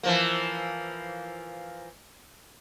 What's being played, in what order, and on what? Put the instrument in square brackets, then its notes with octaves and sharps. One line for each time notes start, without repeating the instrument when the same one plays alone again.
[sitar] E3 F3 A#3